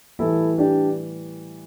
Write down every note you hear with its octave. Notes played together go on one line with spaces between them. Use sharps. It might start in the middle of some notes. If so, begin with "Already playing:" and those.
A2 E3 G3 E4 A4
D4 G4